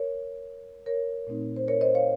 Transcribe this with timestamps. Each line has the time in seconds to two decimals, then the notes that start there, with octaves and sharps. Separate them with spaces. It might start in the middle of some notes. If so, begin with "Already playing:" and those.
Already playing: A#4 C#5
0.86 A#4 C#5
1.27 A#2 A3 C4 D#4
1.56 C5
1.68 A#4 C#5
1.81 C5 D#5
1.94 C#5 F5